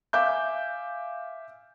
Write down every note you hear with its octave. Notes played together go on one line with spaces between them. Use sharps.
E5 F5 G#5 D6 G6